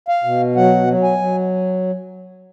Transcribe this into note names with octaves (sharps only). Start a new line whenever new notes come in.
F5
B2
F#3 F#5
F#3
G#5
F#3